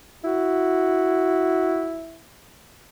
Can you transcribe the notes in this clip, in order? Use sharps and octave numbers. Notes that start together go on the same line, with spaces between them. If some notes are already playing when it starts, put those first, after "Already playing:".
E4 F#4